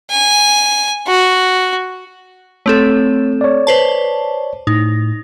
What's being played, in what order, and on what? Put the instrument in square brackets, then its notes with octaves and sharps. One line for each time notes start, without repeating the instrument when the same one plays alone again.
[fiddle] G#5
F#4
[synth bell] A3 C4 A4 [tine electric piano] C#5
[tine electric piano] C#5 D5
[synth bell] B4 C5 A5
[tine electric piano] A2 [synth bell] D#4